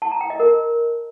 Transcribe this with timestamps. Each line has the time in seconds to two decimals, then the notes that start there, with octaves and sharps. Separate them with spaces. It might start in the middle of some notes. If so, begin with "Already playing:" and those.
0.02 A5
0.11 A#5
0.21 G5
0.30 D#5
0.40 A#4